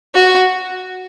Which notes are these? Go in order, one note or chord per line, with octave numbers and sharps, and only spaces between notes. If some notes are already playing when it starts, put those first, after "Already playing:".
F#4